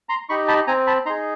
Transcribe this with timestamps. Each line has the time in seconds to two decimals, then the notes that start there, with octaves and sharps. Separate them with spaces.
0.09 A#5 C6
0.29 D#4 G4 B5 C#6
0.48 A5 B5
0.67 C4 G#5 A#5
0.87 A5 B5
1.06 D#4 A#5 C6
1.10 G#4